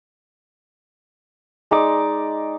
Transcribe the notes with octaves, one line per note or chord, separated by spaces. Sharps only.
G#3 D#4 D5 D6